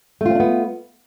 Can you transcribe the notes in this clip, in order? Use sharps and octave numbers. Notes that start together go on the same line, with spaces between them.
A3 B3 C4 D4 F4